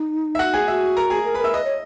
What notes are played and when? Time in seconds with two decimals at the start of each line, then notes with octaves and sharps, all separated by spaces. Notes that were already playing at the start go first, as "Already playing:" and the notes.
Already playing: D#4
0.35 E5
0.39 F#4 F#5
0.54 G#4 G#5
0.68 F#4 E5
0.97 A#4 A#5
1.10 G#4 G#5
1.25 A#4
1.34 B4 B5
1.39 A#4
1.44 E5 E6
1.54 B4 D#5 D#6
1.64 C#5